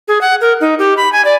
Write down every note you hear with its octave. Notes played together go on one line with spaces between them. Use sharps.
G#4
F#5
A#4
D#4
G4
B5
G#5
D5